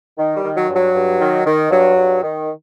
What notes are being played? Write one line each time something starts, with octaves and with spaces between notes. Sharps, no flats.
D#3
G3
D#3
F#3
G2
F#3
G2
D#3
D#3
G2 F#3
G2
D#3